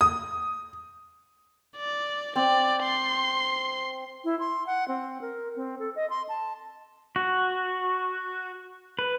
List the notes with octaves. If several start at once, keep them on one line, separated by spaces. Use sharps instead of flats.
D#6
D5
C4 D5
C6
E4
C6
F#5
C4
A#4
C4
A4
D#5
C6
A5
F#4
B4